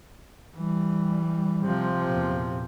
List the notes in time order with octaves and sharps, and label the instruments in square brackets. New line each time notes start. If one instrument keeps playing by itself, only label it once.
[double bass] E3 [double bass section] G3
[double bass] C3 F3
[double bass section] E2 A#2